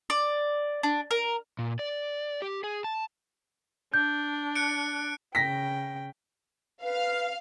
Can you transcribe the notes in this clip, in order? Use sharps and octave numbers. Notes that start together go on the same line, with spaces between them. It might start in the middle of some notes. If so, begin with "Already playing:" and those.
D5
D4
A#4
A#2
D5
G4
G#4
A5
D4 G6
F#6 C#7 D7
C#3 G5 A#6 B6
B4 F5